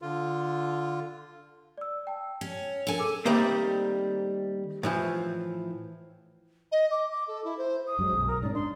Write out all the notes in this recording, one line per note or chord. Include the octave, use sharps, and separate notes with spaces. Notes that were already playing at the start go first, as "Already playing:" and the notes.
D3 F4
D5 E6
G5 A5
C#4
D4 A4 A#4 G#5
G#4 D6 E6
D#3 G3 A3 A#3 C4
A2 E3 F3
D#5
D6
D6
A4
E4
C5
D#6
F#2 F#3 G#3
B1
A#4
G#2 C#4 D5
D4 C6